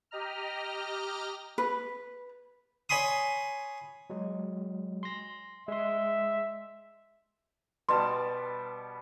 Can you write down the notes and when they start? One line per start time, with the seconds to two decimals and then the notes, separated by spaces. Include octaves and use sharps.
0.11 G4 D#5 A#5 F6
1.58 B4
2.89 C#5 G#5 B5 C6 D#6
4.10 F#3 G#3
5.03 C6 A#6
5.68 G#3 E5 C6
7.89 B2 G3 A5 C6